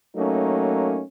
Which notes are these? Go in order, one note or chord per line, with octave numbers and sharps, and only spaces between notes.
F#3 A3 A#3 C#4 D#4